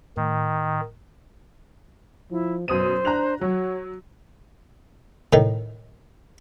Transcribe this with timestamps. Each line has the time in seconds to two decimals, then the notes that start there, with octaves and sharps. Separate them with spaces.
0.17 A2 D#3
2.31 F3 E4
2.68 F#2 B2 C5 D#6 D#7
3.05 D4 A#5 F#6 F7
3.41 F#3 F#4 C#5
5.33 A2 D#3